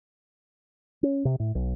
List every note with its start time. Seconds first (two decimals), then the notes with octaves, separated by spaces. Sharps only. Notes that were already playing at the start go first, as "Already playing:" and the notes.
1.03 C#4
1.25 C3
1.40 A2
1.55 B1